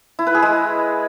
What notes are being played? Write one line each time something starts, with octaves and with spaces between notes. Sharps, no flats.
E4
B4
G#4
G#3